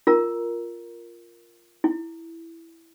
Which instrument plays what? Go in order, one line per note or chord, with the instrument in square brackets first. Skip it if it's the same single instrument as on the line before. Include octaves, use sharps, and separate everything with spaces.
[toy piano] F4 A#4 A#5
E4